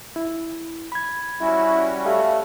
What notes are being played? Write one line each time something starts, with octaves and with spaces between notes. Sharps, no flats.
E4
B5 G#6
G3 C#4 E4 F#4
A3 G4 E5 F5